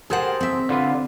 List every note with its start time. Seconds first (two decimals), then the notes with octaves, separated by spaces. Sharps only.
0.10 G4 G#4 A#4 C5 F#5 A5
0.41 C4 E5
0.69 D3 F4 B4